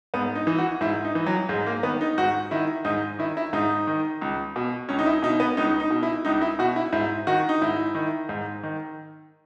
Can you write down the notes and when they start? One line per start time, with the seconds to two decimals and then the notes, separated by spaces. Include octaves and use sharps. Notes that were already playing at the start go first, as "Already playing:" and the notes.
0.14 G#2 B3
0.35 D#4
0.47 E3
0.58 F#4
0.81 G#2 E4
1.05 D#4
1.15 E3
1.27 F#3
1.49 G#2 G#3
1.66 A#3
1.83 D#3 B3
2.01 D#4
2.18 G#2 F#4
2.51 D#3 E4
2.85 G#2 D#4
3.19 D#3 E4
3.37 E4
3.53 G#2 D#4
3.87 D#3
4.21 C#2
4.56 B2
4.89 C#2 C#4
4.99 D#4
5.06 E4
5.23 B2 D#4
5.40 B3
5.57 C#2 D#4
5.80 D#4
5.91 B2
6.03 E4
6.25 C#2 D#4
6.42 E4
6.59 B2 F#4
6.76 E4
6.93 G#2 E4
7.27 D#3 F#4
7.49 D#4
7.62 G#2 E4
7.95 D#3
8.29 G#2
8.63 D#3